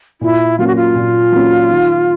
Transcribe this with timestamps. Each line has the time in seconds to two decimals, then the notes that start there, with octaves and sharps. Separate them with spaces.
0.21 A#2 E4
0.59 F#3 A#3 C#4 F4
0.67 F#4
0.76 F4
0.95 A#2
1.32 F#3 A#3 C#4
1.69 D#3